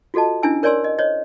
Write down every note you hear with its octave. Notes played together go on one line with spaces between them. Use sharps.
F4 F#4 A4 D#5 A5
C#4 D4 E4 G#5 E6
A#4 C#5 D5 G#5 C6 E6
D#5
C5 C#5 D#5